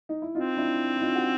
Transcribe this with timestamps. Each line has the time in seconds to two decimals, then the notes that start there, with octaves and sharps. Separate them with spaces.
0.09 D#4
0.22 E4
0.35 C4 D#4 F4
0.57 D4 E4
0.96 E4
1.01 D#4 F4
1.15 F#4